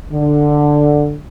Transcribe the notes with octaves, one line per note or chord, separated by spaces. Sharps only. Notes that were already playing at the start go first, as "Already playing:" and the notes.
D3